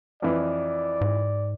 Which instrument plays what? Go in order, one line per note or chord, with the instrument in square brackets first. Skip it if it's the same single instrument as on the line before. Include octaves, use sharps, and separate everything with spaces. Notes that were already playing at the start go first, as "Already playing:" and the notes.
[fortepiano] F2 E3 [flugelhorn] D5
[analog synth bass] G#2